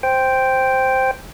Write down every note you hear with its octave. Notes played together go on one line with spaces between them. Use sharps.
C5 G5